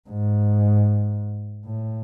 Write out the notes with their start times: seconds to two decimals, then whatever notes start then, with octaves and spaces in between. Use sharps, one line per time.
0.09 G#2
1.65 A2